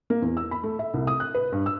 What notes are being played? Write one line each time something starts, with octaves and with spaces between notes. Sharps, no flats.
A#3
E2
E6
B5
A3
E5
C2
D#6
F#6
B4
G2
E6